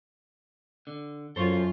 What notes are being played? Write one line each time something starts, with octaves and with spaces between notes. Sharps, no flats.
D3
F#2 F4 A4 C5 C#5